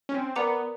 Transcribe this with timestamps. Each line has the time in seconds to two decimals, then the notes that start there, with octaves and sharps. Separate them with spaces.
0.09 C#4
0.14 C4
0.36 B3 A#4 D5 F#5 A#5 D6